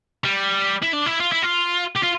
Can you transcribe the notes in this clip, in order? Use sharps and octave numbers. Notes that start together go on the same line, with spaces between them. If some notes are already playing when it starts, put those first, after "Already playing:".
G3
E4
D4
E4
F4
E4
F4
G4
F4